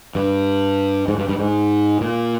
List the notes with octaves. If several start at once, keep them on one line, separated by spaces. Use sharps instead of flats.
G2
G#2
G2
G2
G#2
A#2